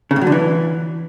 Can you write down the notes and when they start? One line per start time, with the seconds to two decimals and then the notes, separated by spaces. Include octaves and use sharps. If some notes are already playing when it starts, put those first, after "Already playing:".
0.11 C#3
0.16 A2
0.21 F#3
0.27 D3
0.32 E3